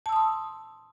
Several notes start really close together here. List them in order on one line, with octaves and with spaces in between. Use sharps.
A5 E6 D#6 C6